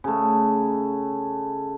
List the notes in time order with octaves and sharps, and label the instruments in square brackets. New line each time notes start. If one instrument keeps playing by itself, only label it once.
[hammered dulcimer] C#3 A3